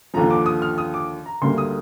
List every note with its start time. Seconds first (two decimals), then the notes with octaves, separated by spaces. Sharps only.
0.14 D#2 D3 F3 A#5
0.30 D6
0.46 D#6
0.62 F6
0.78 D#6
0.94 D6
1.26 A#5
1.42 D2 D3 G3 A#3 C6
1.58 D#6